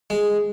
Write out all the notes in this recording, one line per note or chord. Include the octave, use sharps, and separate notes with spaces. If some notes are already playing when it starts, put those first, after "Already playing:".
G#3